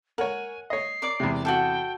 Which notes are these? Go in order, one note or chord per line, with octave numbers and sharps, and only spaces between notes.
A#4 C#5 F#5 G#5
C#5 D#5 C7
A#4 D5 D6
E2 C3
F#4 G#4 A4 G5